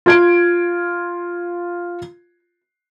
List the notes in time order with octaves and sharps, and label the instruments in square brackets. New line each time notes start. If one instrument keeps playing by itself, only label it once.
[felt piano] F4 G#6 D7